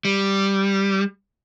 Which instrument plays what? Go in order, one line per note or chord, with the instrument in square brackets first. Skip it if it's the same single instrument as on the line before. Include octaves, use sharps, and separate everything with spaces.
[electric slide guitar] G3